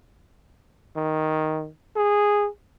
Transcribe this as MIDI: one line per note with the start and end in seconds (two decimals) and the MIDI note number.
0.97 1.69 51
1.96 2.48 68